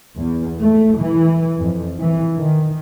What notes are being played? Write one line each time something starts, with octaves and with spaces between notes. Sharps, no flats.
E2
A3
E3
F2
E3
D#3